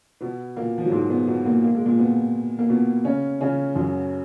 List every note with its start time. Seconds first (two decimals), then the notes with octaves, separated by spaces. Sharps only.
0.21 B2 B3
0.56 A#2 A#3
0.78 F3
0.85 F#3
0.92 G#2 G#3
1.10 B2 B3
1.27 B2 B3
1.46 A#2 A#3
1.64 A#3
1.75 G#3
1.86 A#2 A#3
1.98 B2 B3
2.59 A#3
2.69 B2 B3
3.05 C#3 C#4
3.40 C#3 C#4
3.75 F#2 F#3